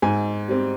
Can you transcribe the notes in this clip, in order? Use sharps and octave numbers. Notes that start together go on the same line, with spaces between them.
G#2 G#5
G3 C4